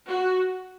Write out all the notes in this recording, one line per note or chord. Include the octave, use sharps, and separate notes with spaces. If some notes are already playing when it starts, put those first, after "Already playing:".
F#4